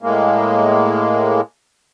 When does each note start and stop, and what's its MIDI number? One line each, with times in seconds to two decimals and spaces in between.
0.03 1.41 45
0.03 1.41 56
0.03 1.41 58